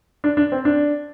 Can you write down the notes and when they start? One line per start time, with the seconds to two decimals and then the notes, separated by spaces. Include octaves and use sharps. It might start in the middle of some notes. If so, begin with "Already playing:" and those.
0.24 D4
0.37 D4
0.52 C4
0.65 D4